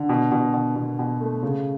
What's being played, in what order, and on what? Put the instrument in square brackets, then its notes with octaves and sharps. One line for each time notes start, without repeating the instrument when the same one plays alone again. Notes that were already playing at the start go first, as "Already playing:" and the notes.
Already playing: [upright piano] D3
B2
B2
B2
B2
B2
A3
C#3